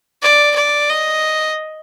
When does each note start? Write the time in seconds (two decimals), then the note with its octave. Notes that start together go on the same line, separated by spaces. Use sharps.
0.22 D5
0.56 D5
0.90 D#5